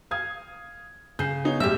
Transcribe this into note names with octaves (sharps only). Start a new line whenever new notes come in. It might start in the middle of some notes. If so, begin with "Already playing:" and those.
F5 D#6 G#6
C#3 G6 C7
B3 D#4 C#5
E1 A1 G4 E5 E6